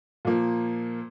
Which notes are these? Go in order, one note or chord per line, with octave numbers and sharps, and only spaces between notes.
A#2 F3 A#3